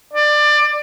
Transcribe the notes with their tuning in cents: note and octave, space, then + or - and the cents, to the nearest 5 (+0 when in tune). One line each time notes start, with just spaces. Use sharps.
D5 +20